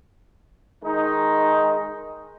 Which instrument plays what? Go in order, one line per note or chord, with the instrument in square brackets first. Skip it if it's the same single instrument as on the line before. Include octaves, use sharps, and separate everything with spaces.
[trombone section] D#3 G#3 D#4